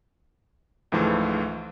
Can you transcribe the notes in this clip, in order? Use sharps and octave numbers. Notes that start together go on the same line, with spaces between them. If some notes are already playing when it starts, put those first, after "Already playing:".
C#2 G#2 E3 F3 A3